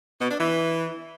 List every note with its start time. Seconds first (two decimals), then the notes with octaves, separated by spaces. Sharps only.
0.21 B2
0.30 D4
0.39 E3